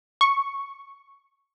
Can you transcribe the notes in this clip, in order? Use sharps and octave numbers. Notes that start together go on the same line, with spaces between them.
C#6